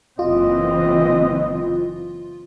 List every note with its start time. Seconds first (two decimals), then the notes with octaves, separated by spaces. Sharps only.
0.19 F#1 E3 C4 F4 D#5